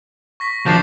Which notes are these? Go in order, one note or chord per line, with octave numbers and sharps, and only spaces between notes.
C#6 A#6 B6
F3 D4 G6 A6 C7